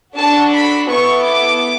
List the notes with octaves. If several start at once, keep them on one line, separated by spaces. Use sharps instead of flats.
D4 F#4 A4 A5
B5
B3 E4 A4 C#6
D6